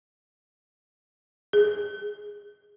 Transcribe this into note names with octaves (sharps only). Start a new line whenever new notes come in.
G#4